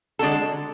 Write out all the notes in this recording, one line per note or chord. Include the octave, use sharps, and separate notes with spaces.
D3 G#3 D4 F#4 A4